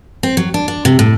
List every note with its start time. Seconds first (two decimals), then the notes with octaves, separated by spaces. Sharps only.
0.23 C4
0.37 F#3
0.54 D4
0.68 D4
0.85 C3
0.99 A2